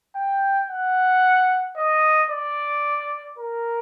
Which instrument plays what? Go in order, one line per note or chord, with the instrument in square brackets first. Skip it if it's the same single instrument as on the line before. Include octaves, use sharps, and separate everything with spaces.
[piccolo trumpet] G5
F#5
D#5
D5
A#4